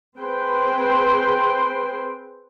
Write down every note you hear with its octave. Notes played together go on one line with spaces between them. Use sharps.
C4 G#4 B4 C5 G5 C6